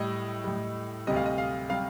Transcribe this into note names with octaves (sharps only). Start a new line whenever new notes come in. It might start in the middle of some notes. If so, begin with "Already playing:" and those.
Already playing: A2 G3 D#5
A2 G3
D2 C3 G3 D#5
F5
D#5
F5
C3 G3 F5